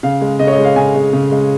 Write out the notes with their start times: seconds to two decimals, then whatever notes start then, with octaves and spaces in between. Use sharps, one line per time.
0.03 C#3 F5
0.21 G#3
0.39 C#3 D#5
0.47 C#5
0.52 D#5
0.58 G#3
0.64 F5
0.76 C#3 G#5
0.95 G#3
1.13 C#3
1.31 G#3